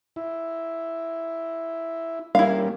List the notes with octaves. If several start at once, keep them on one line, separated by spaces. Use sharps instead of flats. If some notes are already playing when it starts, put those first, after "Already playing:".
E4
G3 A#3 C#4 E4 F5